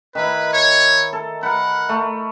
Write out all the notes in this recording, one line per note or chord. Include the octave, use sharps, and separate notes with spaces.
D#3 E4 B4
C#5
A4
A#4 F#5 B5
A3